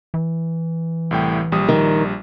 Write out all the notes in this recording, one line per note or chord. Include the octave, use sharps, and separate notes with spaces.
E3
C2 A2 G5
A#1 G3 D#6
D#3